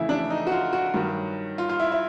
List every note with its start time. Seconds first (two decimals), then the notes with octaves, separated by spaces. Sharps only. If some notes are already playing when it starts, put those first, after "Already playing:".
Already playing: F2 C#3 E3 A3 E4
0.09 D4
0.30 D#4
0.47 F#4
0.52 F4
0.73 F#4
0.94 G2 D#3 F#3
1.58 F4
1.69 F4
1.79 E4
1.92 E4